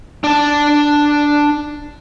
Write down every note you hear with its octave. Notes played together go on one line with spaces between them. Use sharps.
D4 A5